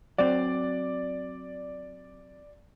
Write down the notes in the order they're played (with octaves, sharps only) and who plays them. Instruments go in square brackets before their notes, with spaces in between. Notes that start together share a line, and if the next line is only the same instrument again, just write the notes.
[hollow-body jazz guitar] F#3 C4 [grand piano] D5